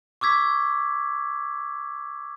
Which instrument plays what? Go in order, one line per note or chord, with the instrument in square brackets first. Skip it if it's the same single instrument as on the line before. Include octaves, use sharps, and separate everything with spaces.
[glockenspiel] C#6 D6 E6 G#6 B6